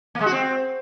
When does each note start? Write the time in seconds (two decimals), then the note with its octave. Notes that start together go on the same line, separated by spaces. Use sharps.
0.15 A#3
0.21 G#3
0.26 F#4
0.32 C4